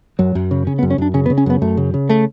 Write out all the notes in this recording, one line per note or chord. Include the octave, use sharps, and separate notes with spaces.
F#2 F#3
F#2
C#3
C#3 C#4
B3
F#2
C#4
F#2 D4
C#3 C#4
B3
C#3
C#4
F#2 B3
F#2 A3
C#3
C#3
A3